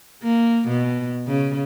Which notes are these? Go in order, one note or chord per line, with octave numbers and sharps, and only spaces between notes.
A#3
B2
C#3